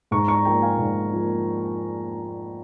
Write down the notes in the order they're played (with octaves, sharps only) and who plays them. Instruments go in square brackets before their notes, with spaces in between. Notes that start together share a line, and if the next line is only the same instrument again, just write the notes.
[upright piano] G#2 A#5 C#6
A#5 C#6
F3 A#3 G5 A#5
F5 G#5
G#2
F3 A#3